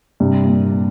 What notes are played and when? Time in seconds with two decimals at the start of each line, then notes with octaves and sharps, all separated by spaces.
0.20 G2 C3
0.44 A#2